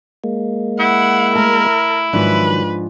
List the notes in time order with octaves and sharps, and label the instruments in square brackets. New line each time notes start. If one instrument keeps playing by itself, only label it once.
[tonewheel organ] G#3 A#3
[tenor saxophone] E4 [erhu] F#5
[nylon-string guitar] A3 A5 [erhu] A#4
[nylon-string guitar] G#2 F3 D4 [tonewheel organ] D#3 F#3 F#6 [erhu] B4